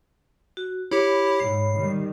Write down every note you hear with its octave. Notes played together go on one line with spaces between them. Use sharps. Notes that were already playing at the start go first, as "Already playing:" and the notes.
F#4
E4 G4 C#5 B5
G#2 C7
D#3 G3